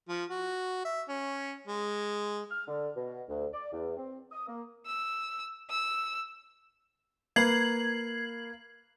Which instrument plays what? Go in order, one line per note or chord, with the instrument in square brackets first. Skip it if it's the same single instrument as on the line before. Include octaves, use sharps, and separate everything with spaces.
[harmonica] F3
F#4
E5
C#4
G#3
[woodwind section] F6
D3
B2
D2
D5
E2
C4
D#6
A#3
[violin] E6
E6
[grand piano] A#3 B4 [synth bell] G#6 C7 F#7